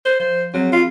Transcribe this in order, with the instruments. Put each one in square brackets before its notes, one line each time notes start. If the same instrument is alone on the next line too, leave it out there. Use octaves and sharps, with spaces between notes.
[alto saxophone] C5
[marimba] F3 [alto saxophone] C5
[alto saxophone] F#3 [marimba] C4 F#4 G#4
[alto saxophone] F4